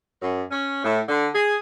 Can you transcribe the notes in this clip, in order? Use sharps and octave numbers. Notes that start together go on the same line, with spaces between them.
F#2
C#4
A2
D3
G#4